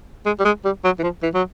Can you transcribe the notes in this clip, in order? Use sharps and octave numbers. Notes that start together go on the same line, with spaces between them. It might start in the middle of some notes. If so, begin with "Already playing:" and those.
G#3
G3
G#3
G3
F#3
E3
F3
E3
F#3